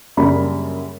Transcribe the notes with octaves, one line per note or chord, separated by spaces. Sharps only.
F#2 C#3 G3 A#3 D4 B5